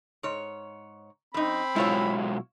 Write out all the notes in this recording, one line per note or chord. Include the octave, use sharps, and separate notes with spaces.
G#2 C#5
F#2 C4 D#4 B5
B2 F#3 G#3 E4 F4 C#5